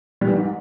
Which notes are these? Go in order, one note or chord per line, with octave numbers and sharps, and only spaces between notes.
G3
E3
G#2